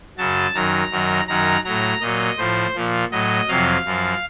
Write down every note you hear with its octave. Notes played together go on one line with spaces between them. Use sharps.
F#2 C#3 F#3 A5
F#2 D#3 F#3 A#5
F#2 D#3 F#3
F#2 D#3 F#3 A#5
A2 F#3 A#5
A#2 F#3 D#5
A2 F3 C5
A#2 F3
A2 F#3 D#5
F2 C3 F#3 F5
F#2 F3